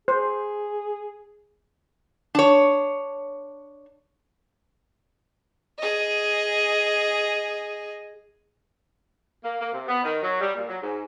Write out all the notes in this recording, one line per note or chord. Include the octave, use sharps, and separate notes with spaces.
G#4 C5
D4 C#5
G#4 D#5
A#3
A#3
C3
B3
D#3
F#3
G3
A#2
F#3
G#2